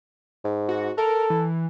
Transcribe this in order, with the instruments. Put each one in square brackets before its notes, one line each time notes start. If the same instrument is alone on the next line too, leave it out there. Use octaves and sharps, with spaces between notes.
[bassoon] G#2
[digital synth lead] F#4
[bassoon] A4 [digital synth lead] A#4
[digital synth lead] E3